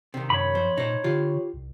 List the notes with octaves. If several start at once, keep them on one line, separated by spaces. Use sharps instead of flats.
C3 D#3
F#2 C#5 B5
F2 C5
A#2 D#4 C5
D3 F4 G4
C2